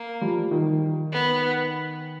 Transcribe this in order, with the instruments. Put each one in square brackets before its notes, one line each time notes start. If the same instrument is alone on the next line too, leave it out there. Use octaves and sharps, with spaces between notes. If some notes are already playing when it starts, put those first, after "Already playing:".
Already playing: [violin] A#3
[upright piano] F3 G3
D#3
[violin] B3